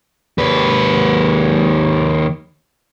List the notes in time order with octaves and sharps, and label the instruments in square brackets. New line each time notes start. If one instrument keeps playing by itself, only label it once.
[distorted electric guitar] D#2 B4